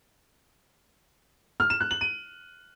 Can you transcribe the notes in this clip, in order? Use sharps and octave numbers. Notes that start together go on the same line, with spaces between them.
F6
E7
F#6
F#7
D#7